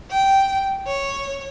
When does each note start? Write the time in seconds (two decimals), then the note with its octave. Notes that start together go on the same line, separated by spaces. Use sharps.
0.10 G5
0.87 C#5